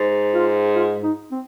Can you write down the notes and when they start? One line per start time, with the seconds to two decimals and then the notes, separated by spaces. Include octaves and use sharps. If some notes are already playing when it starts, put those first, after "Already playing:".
Already playing: G#2
0.34 F4
0.75 F4
1.03 D#4
1.32 C4